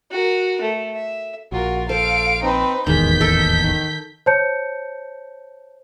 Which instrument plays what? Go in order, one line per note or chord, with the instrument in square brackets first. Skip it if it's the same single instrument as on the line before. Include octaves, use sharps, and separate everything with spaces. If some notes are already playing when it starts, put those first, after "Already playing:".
[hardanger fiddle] F#4 A#4
A3
E5
[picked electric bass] A#1 [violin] F4 A#4 [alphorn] F#4
[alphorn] A4 [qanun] C5 [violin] F5 D7
[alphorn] C4 [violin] D#4 B4
[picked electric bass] D#1 A1 E2 [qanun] D#3 [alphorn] G#3 [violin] G6 B6
[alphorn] D#4 [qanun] A4 G5
[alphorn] D#3
[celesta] C5 C#5 A5 G6 C#7